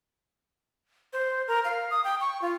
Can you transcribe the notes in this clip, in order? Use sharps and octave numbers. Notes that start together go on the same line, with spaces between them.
C5
A#4
F5
D#6
G5
C#6
F4